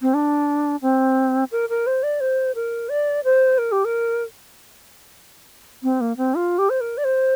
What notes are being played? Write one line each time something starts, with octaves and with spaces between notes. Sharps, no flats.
C4
D4
C4
A#4
A#4
C5
D5
C5
A#4
D5
C5
A#4
G4
A#4
C4
A#3
C4
F4
G4
C5
A#4
D5
C5